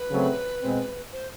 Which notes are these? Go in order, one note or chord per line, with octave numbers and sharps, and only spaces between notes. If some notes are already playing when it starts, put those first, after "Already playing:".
Already playing: B4
C#3 F#3 A3 C4
B2 G#3 C4
C5